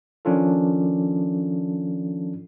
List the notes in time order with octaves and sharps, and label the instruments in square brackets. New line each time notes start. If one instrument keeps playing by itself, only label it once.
[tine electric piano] D#3 F3 C#4 D4 F4 A4